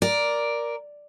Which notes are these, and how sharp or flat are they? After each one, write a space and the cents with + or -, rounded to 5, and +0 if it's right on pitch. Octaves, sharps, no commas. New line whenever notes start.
A#4 +10 D5 +0